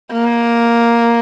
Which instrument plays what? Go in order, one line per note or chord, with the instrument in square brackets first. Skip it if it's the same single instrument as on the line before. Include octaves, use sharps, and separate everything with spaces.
[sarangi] A#3